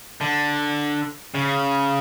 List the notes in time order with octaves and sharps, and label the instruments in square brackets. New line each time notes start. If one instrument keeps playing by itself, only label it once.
[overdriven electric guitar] D3
C#3